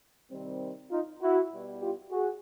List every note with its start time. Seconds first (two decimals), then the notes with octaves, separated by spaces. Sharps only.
0.31 C3 D#3 G3 C4
0.91 D#4 F4
1.22 E4 F#4
1.51 B2 G3 B3
1.82 F4 G4
2.11 F#4 G#4